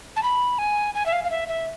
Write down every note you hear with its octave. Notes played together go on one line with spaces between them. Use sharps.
A5
B5
G#5
G#5
E5
F5
F5
E5
E5